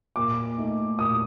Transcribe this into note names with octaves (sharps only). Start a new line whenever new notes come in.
A#2 D6
A3 D#4
A#2 D#6